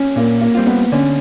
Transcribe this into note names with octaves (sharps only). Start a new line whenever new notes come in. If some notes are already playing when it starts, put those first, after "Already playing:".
Already playing: C#4
A#2 A#3
A#3
G3 C4 F4
B3
D3 C#4